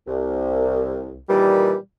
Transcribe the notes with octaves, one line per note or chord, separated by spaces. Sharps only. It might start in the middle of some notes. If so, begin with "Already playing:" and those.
C2
A#2 D#3 E3 G3